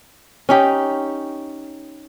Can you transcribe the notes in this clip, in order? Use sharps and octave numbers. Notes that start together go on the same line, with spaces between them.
C#4 D#4 G4